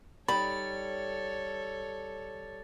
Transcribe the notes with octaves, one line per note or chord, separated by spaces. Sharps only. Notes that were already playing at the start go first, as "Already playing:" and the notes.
G3 D#4 A4 C#5 B5 A6